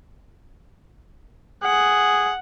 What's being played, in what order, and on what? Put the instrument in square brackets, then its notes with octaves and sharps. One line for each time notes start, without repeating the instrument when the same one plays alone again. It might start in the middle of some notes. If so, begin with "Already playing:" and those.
[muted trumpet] G#4 [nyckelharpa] F#5